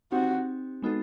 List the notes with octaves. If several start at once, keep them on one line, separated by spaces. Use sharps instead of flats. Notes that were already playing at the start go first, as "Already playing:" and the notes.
C4 D#4 F#4 G4
G#3 B3 D#4 F#4 A4